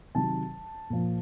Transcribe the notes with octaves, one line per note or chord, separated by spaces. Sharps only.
C3 D#3 F#3 A5
A#2 F3